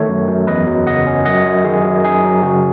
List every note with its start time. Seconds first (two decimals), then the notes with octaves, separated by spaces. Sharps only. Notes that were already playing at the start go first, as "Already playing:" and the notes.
Already playing: D#3 A3 A4 C#5
0.09 F#2
0.28 F#2
0.47 E2 B4 D#5
0.67 F#3
0.86 C#3 D#5 F#5
1.07 C#4
1.25 F#2 D#5 F#5
1.46 F#2
1.64 D#3 G#4
1.85 F#2
2.04 D#4 G#4
2.24 F#3
2.43 C#3 F#4